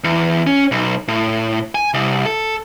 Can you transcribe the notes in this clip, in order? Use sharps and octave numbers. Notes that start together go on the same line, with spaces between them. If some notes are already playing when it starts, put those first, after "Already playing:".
E2
C#4
B1
A2
G#5
C2
A4